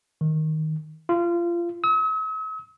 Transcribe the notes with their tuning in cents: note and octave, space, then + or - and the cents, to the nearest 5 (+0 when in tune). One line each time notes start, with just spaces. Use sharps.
D#3 +5
F4 -25
E6 -45